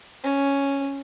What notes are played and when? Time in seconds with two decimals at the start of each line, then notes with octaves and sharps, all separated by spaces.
0.24 C#4